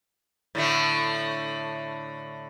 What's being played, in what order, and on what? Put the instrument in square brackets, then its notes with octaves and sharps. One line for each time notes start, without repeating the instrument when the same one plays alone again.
[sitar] A2 D3 A3